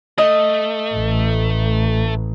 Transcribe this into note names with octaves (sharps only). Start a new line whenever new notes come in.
A3 D#5
A1